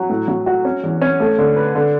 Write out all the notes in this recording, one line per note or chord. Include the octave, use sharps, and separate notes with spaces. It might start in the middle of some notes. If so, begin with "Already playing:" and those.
Already playing: F#3
A2
F#3
F#4
C#4
E2
C#4
A3
D3
B4
D3